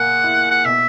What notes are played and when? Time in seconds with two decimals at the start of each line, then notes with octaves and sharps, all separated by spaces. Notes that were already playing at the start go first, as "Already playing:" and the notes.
Already playing: A#2 A#3 G#4 F#5
0.24 E4
0.51 F#5
0.65 B2 E5